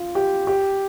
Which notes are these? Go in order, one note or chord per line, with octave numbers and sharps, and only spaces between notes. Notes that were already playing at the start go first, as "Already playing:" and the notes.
Already playing: F4
G4
G4